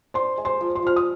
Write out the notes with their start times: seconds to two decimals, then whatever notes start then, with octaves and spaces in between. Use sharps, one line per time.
0.14 D4 C5 C6
0.37 G#3
0.45 C5 C6
0.61 F3
0.75 C5 C6
0.82 F3 F6
0.96 D#6